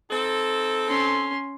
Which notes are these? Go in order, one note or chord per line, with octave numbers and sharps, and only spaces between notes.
C4 D#4 A4
C#4 C6